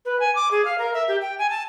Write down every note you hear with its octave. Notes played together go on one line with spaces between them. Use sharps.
B4
G#5
D6
G#4
F5
A#4
E5
G4
G5
G#5
A5